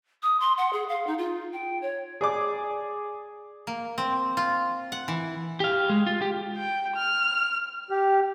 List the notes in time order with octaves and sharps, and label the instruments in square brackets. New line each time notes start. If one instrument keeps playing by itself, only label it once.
[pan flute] D#6
C6
F#5
G#4
F5
D#4
F4
G5
C#5
[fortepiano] G#4 D5 D6
[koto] A#3
C4
F4
F#5
E3
[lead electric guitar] G4 F5
G#3
F4
G4
[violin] G5
F6
[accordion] G4